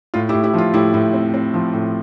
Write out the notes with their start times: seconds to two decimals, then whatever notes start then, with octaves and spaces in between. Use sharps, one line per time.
0.14 A2 F4
0.29 E4 G4
0.34 A2
0.43 E4 G4
0.54 F3 F4
0.74 A2 E4 G4
0.94 A2
1.13 C4
1.34 C4
1.54 F3
1.74 A2